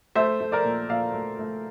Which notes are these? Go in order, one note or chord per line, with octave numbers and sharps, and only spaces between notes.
A3 C5 E5
A3
A#4 D5
A#2
A#2 D5 F5
A3
A3